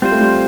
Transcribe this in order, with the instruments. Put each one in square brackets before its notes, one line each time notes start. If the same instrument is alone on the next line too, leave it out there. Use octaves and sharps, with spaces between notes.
[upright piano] G3 [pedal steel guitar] C4 F4 C5
[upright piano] A3
G3